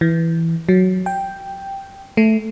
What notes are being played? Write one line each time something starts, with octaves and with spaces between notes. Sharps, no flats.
E3
F#3
G5
A3